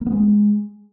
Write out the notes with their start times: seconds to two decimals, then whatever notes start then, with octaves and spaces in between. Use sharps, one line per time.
0.01 A#3
0.06 B3
0.12 G#3